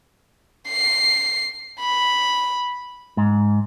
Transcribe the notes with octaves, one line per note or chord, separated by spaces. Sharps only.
C7
B5
G#2